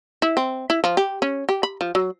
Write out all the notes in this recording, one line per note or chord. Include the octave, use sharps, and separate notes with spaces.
E4
C4
E4
F3
G4
C#4
G4
B5
F3
F#3